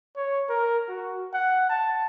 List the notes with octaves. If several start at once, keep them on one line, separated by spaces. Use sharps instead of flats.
C#5
A#4
F#4
F#5
A5